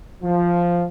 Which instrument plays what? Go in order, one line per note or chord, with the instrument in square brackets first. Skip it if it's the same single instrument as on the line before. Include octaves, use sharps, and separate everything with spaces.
[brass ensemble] F3